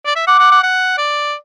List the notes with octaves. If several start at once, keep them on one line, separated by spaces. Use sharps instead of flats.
D5
E5
F#5 D6
F#5
F#5
F#5
D5